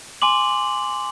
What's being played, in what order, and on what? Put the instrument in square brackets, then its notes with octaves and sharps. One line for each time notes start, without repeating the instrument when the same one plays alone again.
[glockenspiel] G#5 C6 D6 F#7